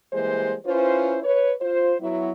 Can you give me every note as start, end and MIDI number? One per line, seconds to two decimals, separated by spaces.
0.13 0.55 52
0.13 0.55 55
0.13 0.55 56
0.13 0.55 58
0.13 0.55 67
0.13 0.55 72
0.65 1.19 61
0.65 1.19 64
0.65 1.19 65
0.65 1.19 71
0.65 1.19 72
1.23 1.52 71
1.23 1.52 73
1.61 1.94 65
1.61 1.94 72
2.00 2.31 54
2.00 2.31 59
2.00 2.31 64